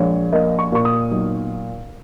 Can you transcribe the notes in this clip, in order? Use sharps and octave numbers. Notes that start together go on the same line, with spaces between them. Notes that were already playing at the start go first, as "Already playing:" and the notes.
Already playing: A#1 G#3 C#5
A#3 D#5
C#6
A#2 C#6
D#6
B1